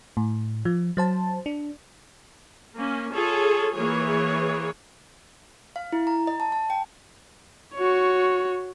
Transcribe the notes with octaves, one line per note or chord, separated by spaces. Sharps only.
A2
F3
F#3 C5 A5
D4
A#3 C#4
F4 G#4 A4 C#5
E3 A#3 G#4 C#5
F5
E4
A#5
D#5
A5
A5
G5
F#4 C#5